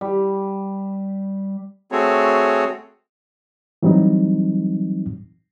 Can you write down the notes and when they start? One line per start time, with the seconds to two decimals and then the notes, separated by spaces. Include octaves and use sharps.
0.01 G3
1.92 A3 C4 F#4 G#4 A4 C#5
3.83 E3 F#3 G3 C4 D#4